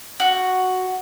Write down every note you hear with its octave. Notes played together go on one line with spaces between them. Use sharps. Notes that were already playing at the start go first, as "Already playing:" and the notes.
F#4